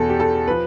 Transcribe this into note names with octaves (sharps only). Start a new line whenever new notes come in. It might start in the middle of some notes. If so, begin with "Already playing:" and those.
Already playing: E2 B2 A4
G4
A4
F3 B4